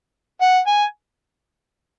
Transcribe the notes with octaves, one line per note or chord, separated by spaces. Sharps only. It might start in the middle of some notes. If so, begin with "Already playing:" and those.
F#5
G#5